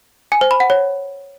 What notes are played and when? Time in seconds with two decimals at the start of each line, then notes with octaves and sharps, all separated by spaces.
0.32 G#5
0.41 C5
0.51 B5
0.60 F#5
0.70 C#5